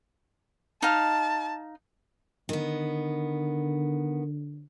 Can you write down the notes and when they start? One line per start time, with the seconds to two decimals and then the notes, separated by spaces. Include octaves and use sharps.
0.82 D#4 F5 A5
2.49 D3 D#3 B3